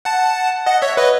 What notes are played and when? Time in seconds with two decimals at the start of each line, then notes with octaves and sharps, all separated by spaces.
0.05 F#5 A5
0.66 D#5 F#5
0.82 C#5 E5
0.97 B4 D#5